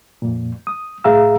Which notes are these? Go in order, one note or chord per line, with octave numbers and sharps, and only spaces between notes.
F2 A#2
D#6
A2 G#4 E5 F5 A#5 E6